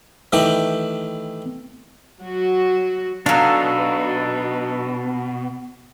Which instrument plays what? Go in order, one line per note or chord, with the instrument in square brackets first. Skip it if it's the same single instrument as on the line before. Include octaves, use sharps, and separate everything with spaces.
[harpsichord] D#3 E3 A3 G4 G5
[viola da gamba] F#3 F#4
[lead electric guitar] B2 [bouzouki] F#3 F5 [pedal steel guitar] D4 D#4 A4